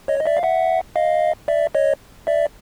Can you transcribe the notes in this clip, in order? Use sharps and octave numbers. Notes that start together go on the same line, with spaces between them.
C#5 D#5
D#5
D5 E5
F5
E5 F#5
D#5 F5
D5 E5
C#5 D#5
D5 E5